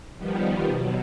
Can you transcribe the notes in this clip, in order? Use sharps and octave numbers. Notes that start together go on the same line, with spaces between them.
D#3 F3 G3 B3
B2 F#3